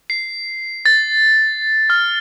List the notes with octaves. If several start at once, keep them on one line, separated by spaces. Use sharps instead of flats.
C7
A6
F6